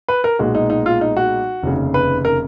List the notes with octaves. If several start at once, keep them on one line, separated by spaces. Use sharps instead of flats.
B4
A#4
B1 A#2 G#3 B3 F#4
D#4
D#4
F4
D#4
F#4
F1 D#2 C#3
B4
A#4